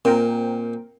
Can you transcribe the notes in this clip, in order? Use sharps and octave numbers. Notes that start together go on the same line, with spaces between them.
A#2 C4 A#4 G5